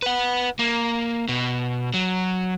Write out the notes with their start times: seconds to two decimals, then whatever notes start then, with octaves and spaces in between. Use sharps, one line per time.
0.02 B4 F#5
0.59 A#3
1.29 B2
1.94 F#3